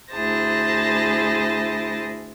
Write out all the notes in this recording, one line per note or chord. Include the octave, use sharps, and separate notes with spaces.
D2 E4 G#4 C5 A5 A#6